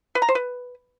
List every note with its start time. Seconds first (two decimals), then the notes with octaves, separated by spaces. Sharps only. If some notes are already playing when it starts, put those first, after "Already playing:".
0.15 B4
0.22 A#5
0.29 C5
0.35 B4